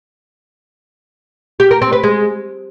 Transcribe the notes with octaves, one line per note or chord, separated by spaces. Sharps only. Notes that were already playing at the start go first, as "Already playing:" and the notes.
G4
A#4
C4
B4
G#3